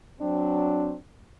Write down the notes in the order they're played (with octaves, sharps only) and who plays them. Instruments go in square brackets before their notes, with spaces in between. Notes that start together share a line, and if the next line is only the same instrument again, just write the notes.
[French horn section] F#3 C4 D4